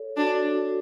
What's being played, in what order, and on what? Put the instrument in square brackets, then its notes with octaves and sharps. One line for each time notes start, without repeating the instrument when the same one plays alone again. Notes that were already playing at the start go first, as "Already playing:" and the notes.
Already playing: [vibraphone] A4 C#5
[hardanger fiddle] D4 [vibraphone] F#4 A4